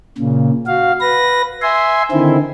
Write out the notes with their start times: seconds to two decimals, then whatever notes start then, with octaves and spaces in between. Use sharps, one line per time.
0.17 A#2 C#3
0.67 F#4 F5
1.01 B4 A#6
1.62 E5 G#5 C6
2.11 D3 D#3 C4 E4